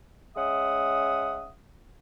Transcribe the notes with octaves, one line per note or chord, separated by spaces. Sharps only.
G#3 C#4 E5 F#5 D#6